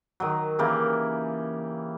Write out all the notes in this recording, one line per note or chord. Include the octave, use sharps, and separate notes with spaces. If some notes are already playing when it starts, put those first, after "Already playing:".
D#3 F#3
C#3 E3 A#3 G4